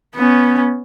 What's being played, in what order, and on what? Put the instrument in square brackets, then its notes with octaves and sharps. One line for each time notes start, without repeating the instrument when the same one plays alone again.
[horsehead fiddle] B3 C#4